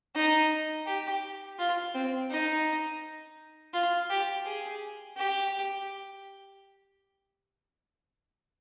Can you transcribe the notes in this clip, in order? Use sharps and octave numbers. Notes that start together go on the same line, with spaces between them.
D#4
G4
F4
C4
D#4
F4
G4
G#4
G4